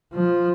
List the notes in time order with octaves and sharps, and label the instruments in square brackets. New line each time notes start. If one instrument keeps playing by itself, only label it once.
[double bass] F3